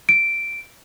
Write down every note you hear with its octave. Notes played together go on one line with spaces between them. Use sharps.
D7